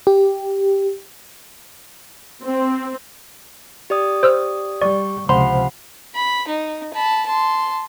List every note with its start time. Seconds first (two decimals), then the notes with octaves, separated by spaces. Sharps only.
0.07 G4
2.44 C4
3.90 G4 D5 D#6
4.23 C5 E6 F6
4.82 G3 D5 C#6
5.29 C#2 C3 F3 C5 F#5 B5 C6
6.15 B5
6.48 D#4
6.94 A5 B5
7.26 A5 C6